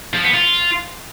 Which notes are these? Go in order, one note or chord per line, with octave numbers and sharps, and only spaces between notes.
F3
B3
F4